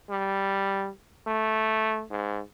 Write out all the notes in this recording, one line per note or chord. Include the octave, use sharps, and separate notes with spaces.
G3
A3
G#2